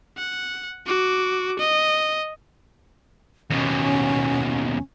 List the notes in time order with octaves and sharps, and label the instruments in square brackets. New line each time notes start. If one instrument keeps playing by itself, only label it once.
[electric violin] F#5
F#4 D6
D#5
[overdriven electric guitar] D#2 B2 [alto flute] C#4